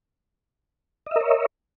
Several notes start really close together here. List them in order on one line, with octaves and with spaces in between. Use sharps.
D#5 E5 A#4 C#5